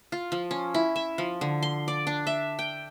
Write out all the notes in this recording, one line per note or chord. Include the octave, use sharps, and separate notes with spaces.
F4
F3
C#4
E4
E5
F3
D3
C6
D5
D4
E5
G5